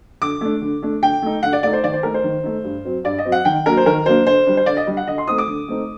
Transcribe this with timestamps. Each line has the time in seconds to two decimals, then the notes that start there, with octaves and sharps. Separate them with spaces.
0.22 D3 D6
0.41 A3 D4
0.62 D3
0.82 A3 D4
1.02 D3 G5
1.22 A3 D#4
1.43 D3 F#5
1.53 D5
1.63 A3 D#4 D5
1.73 C5
1.83 D#3 D5
1.93 C5
2.03 A3 D#4 A#4
2.14 C5
2.24 D#3
2.43 A3 D#4
2.64 G2
2.85 F#3 C4
3.04 G2 D5
3.18 D#5
3.25 F#3 C4
3.32 F#5
3.45 D#3 G5
3.66 F#3 A#3 D4 A#4
3.77 C5
3.86 D#3 A#4
4.06 F#3 A#3 D4 C5
4.27 D3 C5
4.46 G3 D4
4.57 C5
4.66 D3 D5
4.77 D#5
4.87 G3 D4
4.97 F#5
5.07 D3 D#5
5.18 C6
5.27 A3 C4 D#4 D#6
5.38 D6
5.48 D3
5.68 A3 C4 D#4